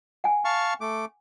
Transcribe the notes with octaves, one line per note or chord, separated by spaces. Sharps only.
F#5 G#5
F5 A5 C#6
A3 D6